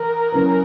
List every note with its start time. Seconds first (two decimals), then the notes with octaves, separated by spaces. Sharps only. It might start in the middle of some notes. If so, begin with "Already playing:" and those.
Already playing: E3 A#4
0.33 F#3 C#4 E4 B4